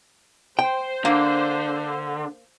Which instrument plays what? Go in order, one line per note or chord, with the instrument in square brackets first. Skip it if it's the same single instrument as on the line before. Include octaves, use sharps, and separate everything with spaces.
[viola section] C5 [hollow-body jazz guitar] G5
[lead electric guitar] D3 [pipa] A#3